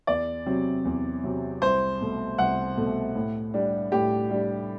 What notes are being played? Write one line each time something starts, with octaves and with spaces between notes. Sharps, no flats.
E2 D5
C3 F#3 C4
E2
C3 F#3 C4
C2 C5
B2 A3
C2 F#5
B2 A3
A2
G3 D4
A2 G4
G3 D4